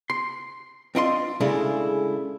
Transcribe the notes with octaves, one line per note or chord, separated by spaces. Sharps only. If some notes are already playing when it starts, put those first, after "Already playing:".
C6
C4 D4 E4 F4 D#5 C6
C#3 G#3 A3 D4 E4